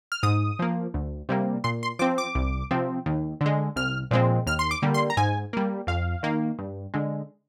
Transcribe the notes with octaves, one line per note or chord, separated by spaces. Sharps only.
F6
G#2 D#6
F3 A#3
D2
C3 G3 A#3
A#2 C6
C6
F3 C4 D6
D6
C2
C3 F3 C4
D#2
D3
G#3
C2 F6
A#2 F3 G#3 C4
D#2 F6
C6
D6
D3 G3 A#3
C6
A#5
G#2 G#5
G3 A#3
F2 F5
D#3 A#3
G2
D3 G#3